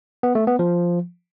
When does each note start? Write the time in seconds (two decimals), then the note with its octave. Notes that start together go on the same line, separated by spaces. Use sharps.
0.23 B3
0.35 A3
0.47 B3
0.59 F3